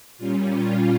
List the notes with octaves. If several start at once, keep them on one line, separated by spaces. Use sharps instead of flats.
A#2 G3 C#4 F4
F4